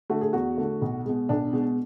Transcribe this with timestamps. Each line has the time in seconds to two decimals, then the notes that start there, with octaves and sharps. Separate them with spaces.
0.10 D3 A3 F#4
0.21 G#4
0.33 E2 F#4
0.57 D3 A3
0.82 B1
1.05 B2 G#3
1.29 B1 D4
1.53 B2 G#3